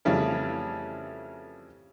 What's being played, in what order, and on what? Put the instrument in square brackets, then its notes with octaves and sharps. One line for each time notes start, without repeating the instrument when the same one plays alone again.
[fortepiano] F2 C#3 E3 G3 A3 C#4